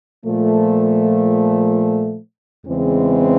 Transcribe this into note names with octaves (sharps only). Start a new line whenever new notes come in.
A#2 F3 A3
E2 C#3 E3 G#3 C4